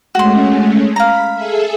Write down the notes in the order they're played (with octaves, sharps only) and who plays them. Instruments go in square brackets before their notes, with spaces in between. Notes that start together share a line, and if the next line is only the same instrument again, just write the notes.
[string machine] G#3 A3 C#4 [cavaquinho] F#4 C6
[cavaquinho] F5 A#5 [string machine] B5
[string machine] G#4 A4 E5